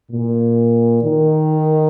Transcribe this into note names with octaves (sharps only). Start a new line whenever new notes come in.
A#2
D#3